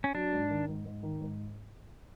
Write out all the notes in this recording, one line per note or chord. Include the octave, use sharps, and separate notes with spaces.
C#4
F#3 D4
G#2
D#3
G#2
G#2
D#3
G#2